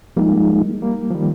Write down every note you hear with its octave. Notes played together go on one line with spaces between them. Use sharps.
F3 G3 G#3 A#3 D#4
G3 A#3
F3
D#3 G3